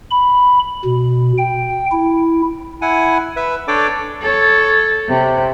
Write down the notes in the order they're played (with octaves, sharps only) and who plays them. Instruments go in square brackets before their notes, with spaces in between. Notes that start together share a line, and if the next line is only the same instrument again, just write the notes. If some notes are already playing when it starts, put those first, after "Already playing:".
[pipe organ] B5
B2
G5
E4
[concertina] E4 F#5 G#5
B4 E5
D4 A4 C#5 D5 G5 D6
[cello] A4 C#5
C3